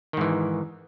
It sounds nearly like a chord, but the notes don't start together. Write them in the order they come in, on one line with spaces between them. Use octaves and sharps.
D#3 G#2 E3